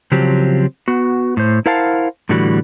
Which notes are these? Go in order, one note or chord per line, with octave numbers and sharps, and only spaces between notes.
C#3 F3 F#3 C4 G4
B3 F#4
A2 C5
E4 A#4 C5 F5 F#5 A5
A2 D3 E3 G3 F#4